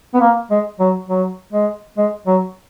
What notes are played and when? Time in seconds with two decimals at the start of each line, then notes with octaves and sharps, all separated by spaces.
0.14 B3
0.20 A#3
0.50 G#3
0.79 F#3
1.09 F#3
1.52 G#3
1.97 G#3
2.27 F#3